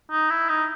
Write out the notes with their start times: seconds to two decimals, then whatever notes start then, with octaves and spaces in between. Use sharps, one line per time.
0.11 D#4
0.30 E4
0.49 D#4